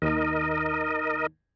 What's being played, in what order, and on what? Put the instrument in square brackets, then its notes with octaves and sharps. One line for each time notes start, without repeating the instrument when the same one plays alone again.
[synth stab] D#2 [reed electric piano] D#3 D#4 [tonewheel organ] A#4 D#5